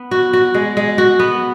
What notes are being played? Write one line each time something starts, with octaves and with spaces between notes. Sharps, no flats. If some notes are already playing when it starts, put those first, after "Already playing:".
Already playing: B3
F#4
F#4
G#3
G#3
F#4
B3